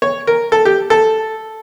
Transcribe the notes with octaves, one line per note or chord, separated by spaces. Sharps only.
C#5
A#4
A4
G4
A4